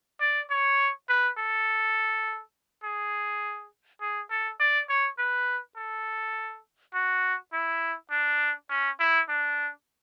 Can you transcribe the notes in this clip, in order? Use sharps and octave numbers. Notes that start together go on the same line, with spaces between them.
D5
C#5
B4
A4
G#4
G#4
A4
D5
C#5
B4
A4
F#4
E4
D4
C#4
E4
D4